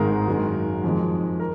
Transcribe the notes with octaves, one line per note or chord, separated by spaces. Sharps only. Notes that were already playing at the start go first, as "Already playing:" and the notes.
Already playing: G#1 G#2 D#3 G#3 A#4
F#2 D#3 G#3
F2 D#3 G#3
A#4